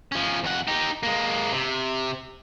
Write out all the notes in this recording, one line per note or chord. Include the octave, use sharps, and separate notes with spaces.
F3 C#4
F2 F#5
D#4 G4
G#3 A#3
C3